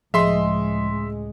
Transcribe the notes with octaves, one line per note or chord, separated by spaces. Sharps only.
C#2 A2 F3 G#3 G#4 D#5 E5 C6